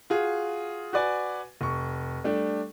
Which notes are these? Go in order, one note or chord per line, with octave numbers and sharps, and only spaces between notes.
F4 F#4 G#4
F#4 B4 D5 G#5
F1 C#6
G3 A3 D4